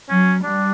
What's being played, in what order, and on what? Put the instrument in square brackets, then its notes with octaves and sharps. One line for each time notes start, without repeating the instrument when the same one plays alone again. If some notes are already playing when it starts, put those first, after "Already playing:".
[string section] F#3 [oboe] C#4
[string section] G3 [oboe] D4